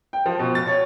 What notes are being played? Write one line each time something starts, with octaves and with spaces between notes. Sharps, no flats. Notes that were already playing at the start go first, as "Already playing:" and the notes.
G5
F3
B2
A6
C#5